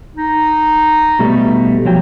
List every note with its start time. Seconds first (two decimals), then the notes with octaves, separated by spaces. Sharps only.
0.16 D#4
1.19 B2 G3 A3
1.85 F3 F#3 G5